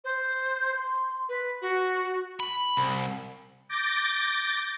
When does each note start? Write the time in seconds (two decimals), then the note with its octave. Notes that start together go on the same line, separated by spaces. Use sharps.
0.04 C5
0.76 C6
1.29 B4
1.61 F#4
2.40 B5
2.77 C2
3.69 D6 G6 A6 A#6